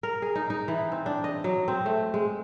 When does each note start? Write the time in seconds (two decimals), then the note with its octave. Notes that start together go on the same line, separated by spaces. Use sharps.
0.03 A#4
0.22 G#4
0.35 D#4
0.50 D#4
0.68 E3
0.92 C4
1.06 D4
1.24 D#5
1.44 F#3
1.68 C4
1.86 A3
2.14 G#3